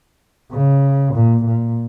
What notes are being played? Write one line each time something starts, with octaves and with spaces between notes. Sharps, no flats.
C#3
A#2
A#2